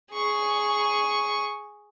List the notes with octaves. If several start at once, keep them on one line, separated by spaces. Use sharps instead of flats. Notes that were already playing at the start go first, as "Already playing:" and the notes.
G#4 C#6